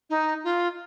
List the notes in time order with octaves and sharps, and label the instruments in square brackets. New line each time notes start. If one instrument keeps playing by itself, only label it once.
[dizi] D#4
F4